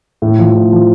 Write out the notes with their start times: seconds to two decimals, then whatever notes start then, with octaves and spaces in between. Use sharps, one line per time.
0.22 A2
0.39 F3
0.55 A2
0.72 F3